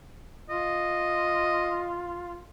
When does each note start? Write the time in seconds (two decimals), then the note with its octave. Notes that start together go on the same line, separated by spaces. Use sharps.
0.50 F4 D#5